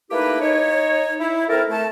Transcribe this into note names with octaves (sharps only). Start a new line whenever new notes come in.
A3 A#3 D#4 E4 G4 B4
D#4 C#5
E4
C4 E4 A4 A#4
A3 A5